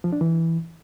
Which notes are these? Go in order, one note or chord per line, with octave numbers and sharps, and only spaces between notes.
F3
D4
E3